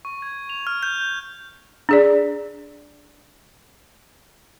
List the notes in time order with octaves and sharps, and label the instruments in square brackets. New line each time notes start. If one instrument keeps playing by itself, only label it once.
[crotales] C#6
G#6
F7
F6
G6
[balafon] D4 G#4 D5